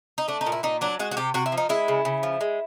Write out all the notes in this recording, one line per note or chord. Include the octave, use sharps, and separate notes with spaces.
D#4
A3 D4
D#4
A#2
E4
A#2 D#4
F#3 D4
G#3 F#4
F#4
C3 G4
C3 F#4
E4
F3
D#4
G#3 E4
C#3
C#3
F3
G#3